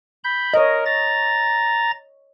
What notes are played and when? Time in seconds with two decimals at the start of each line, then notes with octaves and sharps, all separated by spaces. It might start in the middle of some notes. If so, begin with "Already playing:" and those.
0.24 B5 G6
0.54 A#4 C#5 D#5
0.85 A#5 A6